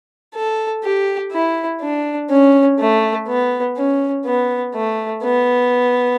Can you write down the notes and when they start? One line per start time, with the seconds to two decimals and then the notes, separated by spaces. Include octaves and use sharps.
0.35 A4
0.84 G4
1.32 E4
1.81 D4
2.30 C#4
2.79 A3
3.28 B3
3.77 C#4
4.26 B3
4.75 A3
5.23 B3